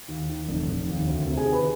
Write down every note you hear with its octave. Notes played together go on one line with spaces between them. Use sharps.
D#2
D#3
F1
F1
D#2
D2
C3
G#4 G#5
D#3
B4 B5